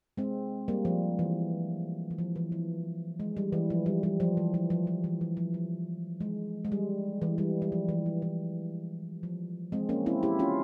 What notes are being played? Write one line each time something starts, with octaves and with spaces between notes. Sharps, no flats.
G#3 C4
G3 A#3
F3
E3
E3
F3
E3
F3
G#3
G3
E3
F3
G3
G3
F3
E3
F3
F3
F3
E3
E3
F3
F3
G#3
G#3
G3
E3
G3
G3
F3
E3
F3
E3
F3
G#3 C4
A#3 C#4
C4 E4
E4 G4
C#4 F4